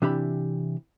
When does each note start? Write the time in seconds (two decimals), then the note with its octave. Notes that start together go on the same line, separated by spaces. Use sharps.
0.02 C3 E3 D4 G4 E5 B5